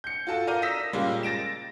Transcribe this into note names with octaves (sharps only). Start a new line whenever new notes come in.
G6 C#7
F4 F#4 A4 A5
A#4 D5 F5 A#5 G6 D#7
D#6 E6 A#6 B6 E7
A#2 C#3 G3 G#3 A#3
A6 A#6 D7 E7